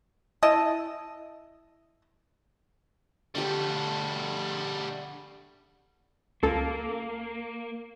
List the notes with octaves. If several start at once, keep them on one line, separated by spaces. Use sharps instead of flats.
E4 D#5 A5
D3 G3 A3 G4
C#2 A#3 A4